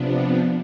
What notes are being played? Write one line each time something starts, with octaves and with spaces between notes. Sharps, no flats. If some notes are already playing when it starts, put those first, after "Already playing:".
Already playing: C3 F3 B3 D4